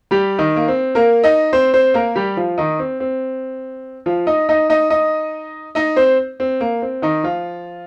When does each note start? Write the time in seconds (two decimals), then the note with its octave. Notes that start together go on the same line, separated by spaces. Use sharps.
0.11 G3 G4
0.39 D#3 D#4
0.56 A#3
0.68 C4
0.95 A#3 A#4
1.24 D#4 D#5
1.53 C4 C5
1.74 C4 C5
1.94 A#3 A#4
2.15 G3 G4
2.37 F3 F4
2.58 D#3 D#4
2.79 C4
3.00 C4
4.06 F3 F4
4.27 D#4 D#5
4.49 D#4 D#5
4.70 D#4 D#5
4.90 D#4 D#5
5.75 D#4 D#5
5.96 C4 C5
6.40 C4
6.61 A#3
6.82 C4
7.02 D#3 D#4
7.23 F3 F4